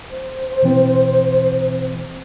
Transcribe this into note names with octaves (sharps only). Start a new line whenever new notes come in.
C5
B2 E3 C4